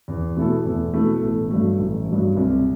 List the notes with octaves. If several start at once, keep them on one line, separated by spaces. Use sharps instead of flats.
E2
B2 A3 E4 A4
E2
B2 A3 E4 A4
A1
G2 F#3 A3
A1
G2 F#3 A3
C2